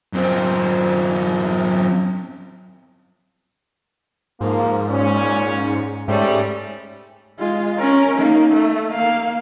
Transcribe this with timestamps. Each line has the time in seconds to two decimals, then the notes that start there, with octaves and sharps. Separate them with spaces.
0.13 F#2 C4
4.41 G#2 F3 A#3
4.91 A#2 C#4
6.08 G#2 G3 A3 C#4
7.39 G#3 F4
7.78 C#4 A#4
8.18 A#3 D#4
8.54 A3
8.92 A#3 F5